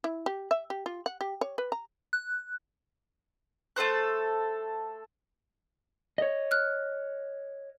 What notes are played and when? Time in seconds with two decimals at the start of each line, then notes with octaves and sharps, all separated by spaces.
0.04 E4
0.26 G4
0.51 E5
0.70 G4
0.86 F4
1.06 F#5
1.21 G4
1.41 C#5
1.58 B4
1.72 A#5
2.13 F#6
3.76 A3 A4 C5 F#6
6.18 C#5 D#5
6.51 F6 F#6